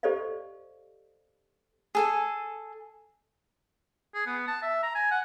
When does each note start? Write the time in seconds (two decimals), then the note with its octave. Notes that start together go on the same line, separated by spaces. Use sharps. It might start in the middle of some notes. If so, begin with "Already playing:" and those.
0.03 G4 A4 C5 D5 D#5 F5
1.95 G#4 A4 G#5
4.15 G#4
4.26 B3
4.47 A5
4.63 E5
4.83 A#5
4.95 G#5
5.11 F#5